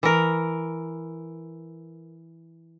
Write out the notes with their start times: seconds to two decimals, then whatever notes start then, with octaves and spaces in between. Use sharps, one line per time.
0.03 E3 A#4